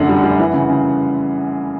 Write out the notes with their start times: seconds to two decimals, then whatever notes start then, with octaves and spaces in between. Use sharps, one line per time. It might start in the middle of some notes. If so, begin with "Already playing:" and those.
Already playing: F1 F#2 D3 F#5
0.09 G3
0.24 G3
0.39 E3
0.53 C#3
0.70 C#3